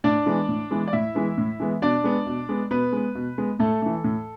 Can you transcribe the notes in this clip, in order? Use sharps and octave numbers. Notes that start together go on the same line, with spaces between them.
A2 D4 D5
E3 G#3 B3
A2
E3 G#3 B3
D5
A2 E4 E5
E3 G#3 B3
A2
E3 G#3 B3
B2 D4 D5
G#3 B3
B2
G#3 B3
B2 B3 B4
G#3 B3
B2
G#3 B3
A2 A3 A4
E3 A3
A2